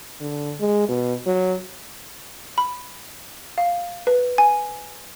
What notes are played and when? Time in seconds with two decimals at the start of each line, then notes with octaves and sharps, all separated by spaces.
0.21 D3
0.60 G#3
0.88 B2
1.26 F#3
2.58 B5
3.58 F5
4.07 B4
4.38 G#5